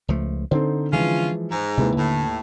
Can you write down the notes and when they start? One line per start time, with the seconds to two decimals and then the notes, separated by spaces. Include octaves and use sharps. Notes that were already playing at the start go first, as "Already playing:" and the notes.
0.08 C#2 F3 A3
0.51 D3 C4 D#4 A4 C5
0.93 E3 F3 G#3 C#4 F4
1.51 G#2
1.77 D#2 C3 G#3 A#3 E4 B4
1.97 A2 D3